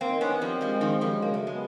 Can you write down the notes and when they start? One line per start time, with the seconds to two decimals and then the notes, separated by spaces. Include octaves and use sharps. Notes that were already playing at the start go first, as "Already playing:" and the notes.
0.01 D#3 A#3 C4
0.21 B3 C#4
0.32 C4
0.42 F3 G3
0.61 F3 G3 G#3
0.81 D#3 F3
0.91 F#2
1.01 F3 G3
1.21 C#3 A#3
1.34 A3
1.47 G#3 B3